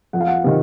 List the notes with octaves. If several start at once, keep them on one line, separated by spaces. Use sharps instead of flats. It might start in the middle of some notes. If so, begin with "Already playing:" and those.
F2 F#5
F5
F#5
C3 D#3